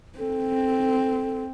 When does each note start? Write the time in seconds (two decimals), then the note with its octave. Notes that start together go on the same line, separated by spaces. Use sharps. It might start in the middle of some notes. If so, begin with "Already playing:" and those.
0.18 C4 A4